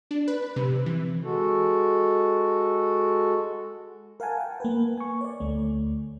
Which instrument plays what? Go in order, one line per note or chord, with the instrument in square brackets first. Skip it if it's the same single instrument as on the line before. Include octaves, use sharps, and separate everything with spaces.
[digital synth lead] D4
B4
C3
E3
[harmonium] G#3 F#4 A4
[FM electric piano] A#4 F5 F#5 G#5 A5
F#5 G5
A#3 A#4 B4
G#5 C#6
C#5 D5
D2 A3